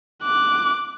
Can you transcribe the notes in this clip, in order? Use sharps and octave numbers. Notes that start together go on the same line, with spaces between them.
D6 F#6